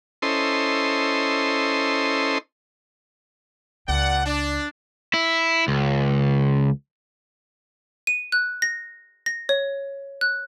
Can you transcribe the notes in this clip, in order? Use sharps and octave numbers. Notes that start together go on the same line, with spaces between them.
C#4 E4 A4 C5 D#5 C6
C#2 A#2 D5 F#5
D4
E4
C#2
D#7
F#6
A#6
A#6
C#5
F#6